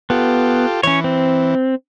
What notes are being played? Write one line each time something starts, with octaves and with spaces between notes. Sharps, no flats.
B3 F4 G4 A4
E3 C#4 C#5
C4